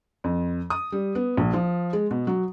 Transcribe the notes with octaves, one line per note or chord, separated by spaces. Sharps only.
F2
D#6
G3
B3
A#1
F3
G#3
B2
F#3